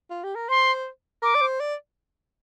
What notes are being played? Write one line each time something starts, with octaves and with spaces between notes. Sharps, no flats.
F4
G4
A#4
C5 C6
A#4 D6
D5
C5
D5